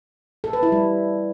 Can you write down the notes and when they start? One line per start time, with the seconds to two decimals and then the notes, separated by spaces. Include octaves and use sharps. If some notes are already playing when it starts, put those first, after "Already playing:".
0.44 A4
0.53 B4
0.63 E4
0.72 G3